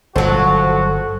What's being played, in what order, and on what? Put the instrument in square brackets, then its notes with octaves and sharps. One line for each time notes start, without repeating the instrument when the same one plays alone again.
[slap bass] G1 [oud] F3 F#3 [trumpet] F#4 [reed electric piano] A4 C5